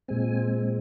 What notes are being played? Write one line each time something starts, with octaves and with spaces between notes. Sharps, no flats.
A#2 G#3 C4 G#5